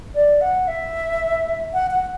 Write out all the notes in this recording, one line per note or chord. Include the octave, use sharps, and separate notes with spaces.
D5
F#5
E5
F#5
F#5